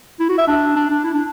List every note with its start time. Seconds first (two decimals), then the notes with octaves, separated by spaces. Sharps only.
0.20 E4
0.29 F#4
0.38 E5
0.48 D4
0.76 D4
0.90 D4
1.04 E4
1.14 D4